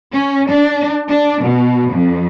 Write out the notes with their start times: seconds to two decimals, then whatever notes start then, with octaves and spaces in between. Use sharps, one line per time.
0.11 C#4
0.50 D4
1.08 D4
1.43 B2
1.91 F2